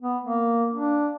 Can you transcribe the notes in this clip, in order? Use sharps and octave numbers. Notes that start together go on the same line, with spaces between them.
B3
A#3
D4